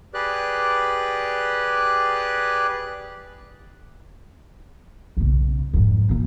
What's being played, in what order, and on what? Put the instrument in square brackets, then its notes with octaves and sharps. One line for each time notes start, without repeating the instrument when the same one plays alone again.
[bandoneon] G4 G#4 B4 D5 F#6
[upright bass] B1 C#3
F2 G#2
E2 A#2